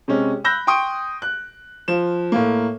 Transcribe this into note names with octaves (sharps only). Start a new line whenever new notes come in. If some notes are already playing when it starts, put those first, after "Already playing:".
C3 G#3 C#4
B5 E6 F#6 G6 A#6
G5 C6 C#6 D#6 D7
F#6
F3 E7
A2 A#3